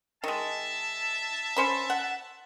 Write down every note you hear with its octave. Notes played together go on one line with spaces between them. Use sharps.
D#3 G#3 E5 A5
C#4 C5 B5
F#5